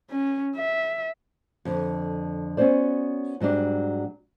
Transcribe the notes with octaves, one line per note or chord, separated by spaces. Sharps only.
C#4
E5
F2 D3
B3 C#4 F#4 C5 D5
G#2 F#3 G3 D4